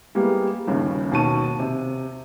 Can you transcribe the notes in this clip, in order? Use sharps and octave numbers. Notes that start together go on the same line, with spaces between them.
G3 G#3 A#3 B3 E4 G4
G1 D#2 C#3
D#2 B2 F#4 A5 C#6 D#7
C3